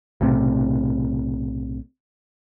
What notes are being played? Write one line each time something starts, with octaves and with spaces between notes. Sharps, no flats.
B1 A2 C3